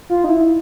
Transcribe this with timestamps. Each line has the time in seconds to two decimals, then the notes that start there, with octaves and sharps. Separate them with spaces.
0.10 F4
0.24 D#4
0.29 E4